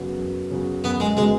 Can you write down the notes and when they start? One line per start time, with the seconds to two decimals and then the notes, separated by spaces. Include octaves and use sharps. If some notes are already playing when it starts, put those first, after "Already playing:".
Already playing: F#2 C#3 F#3 B3 F#4
0.17 F#2
0.50 C#3 F#3 B3 F#4
0.83 F#2 B3
1.00 G#3
1.16 C#3 F#3 G#3 B3 F#4